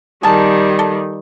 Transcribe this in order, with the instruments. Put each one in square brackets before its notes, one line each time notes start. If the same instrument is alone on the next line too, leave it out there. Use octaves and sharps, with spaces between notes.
[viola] D#3 G3 [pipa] G#4 A#4 A5
[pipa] A4